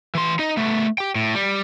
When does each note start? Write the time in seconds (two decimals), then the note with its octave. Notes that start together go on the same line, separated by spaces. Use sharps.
0.15 E3 C6
0.39 D#4 D#5
0.57 A3 B3
0.98 G4 G5
1.15 A2
1.34 G3